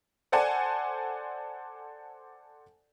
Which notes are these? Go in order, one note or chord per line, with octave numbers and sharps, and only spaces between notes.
A4 C5 D5 F#5 G#5 A5